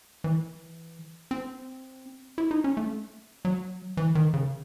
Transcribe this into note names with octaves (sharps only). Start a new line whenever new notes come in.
E3
C4
E4
D#4
C#4
A3
F#3
E3
D#3
C#3